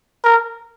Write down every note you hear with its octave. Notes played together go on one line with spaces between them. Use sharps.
A#4